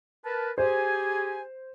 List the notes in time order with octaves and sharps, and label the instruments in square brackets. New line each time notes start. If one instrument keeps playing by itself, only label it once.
[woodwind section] A#4 B4 A5
[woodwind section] G4 G#4 G#5 [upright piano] C5